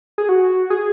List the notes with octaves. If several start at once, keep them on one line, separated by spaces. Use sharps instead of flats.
G#4
F#4
G#4